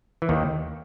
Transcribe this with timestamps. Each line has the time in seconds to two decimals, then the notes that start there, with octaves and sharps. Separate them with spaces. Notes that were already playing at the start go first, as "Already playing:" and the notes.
0.22 E3
0.29 D#2 D#3